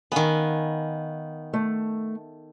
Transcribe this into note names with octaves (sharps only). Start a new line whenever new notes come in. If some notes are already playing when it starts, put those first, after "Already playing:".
D#3 B3 F5 G#5
A3